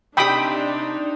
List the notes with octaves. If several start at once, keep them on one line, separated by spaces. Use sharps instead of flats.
C3 D4 D#4 G4 G5 B5 D#6